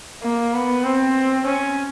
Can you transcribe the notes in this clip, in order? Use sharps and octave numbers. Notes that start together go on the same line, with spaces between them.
A#3
B3
C4
C#4